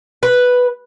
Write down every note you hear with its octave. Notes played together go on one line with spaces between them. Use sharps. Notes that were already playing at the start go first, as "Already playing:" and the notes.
B4